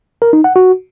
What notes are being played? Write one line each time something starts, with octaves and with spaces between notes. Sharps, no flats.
A#4
D#4
F#5
F#4